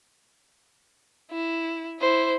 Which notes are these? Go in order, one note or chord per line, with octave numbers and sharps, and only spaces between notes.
E4
E4 C5